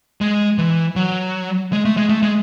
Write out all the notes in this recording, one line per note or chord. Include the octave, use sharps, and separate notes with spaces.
G#3
E3
F#3
G#3
A3
G#3
A3
G#3